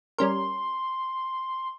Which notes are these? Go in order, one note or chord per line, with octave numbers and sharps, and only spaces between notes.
G3 C#4 A#4 C6